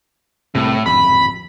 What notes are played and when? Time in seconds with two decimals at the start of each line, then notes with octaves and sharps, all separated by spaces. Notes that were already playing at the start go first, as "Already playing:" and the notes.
0.55 C2 A2 C3
0.86 D1 G#1 F2 B5